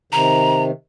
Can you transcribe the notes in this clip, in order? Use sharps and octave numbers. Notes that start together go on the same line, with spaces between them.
C3 D#3 A#5